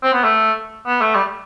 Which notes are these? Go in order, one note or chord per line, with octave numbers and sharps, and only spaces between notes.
C4
B3
A3
B3
A3
G3